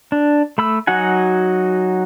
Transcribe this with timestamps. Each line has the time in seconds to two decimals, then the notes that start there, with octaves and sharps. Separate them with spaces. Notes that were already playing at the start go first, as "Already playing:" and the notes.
0.12 D4
0.58 A3 B5 E6
0.87 F#3 D#4 F#4 F#5 G#5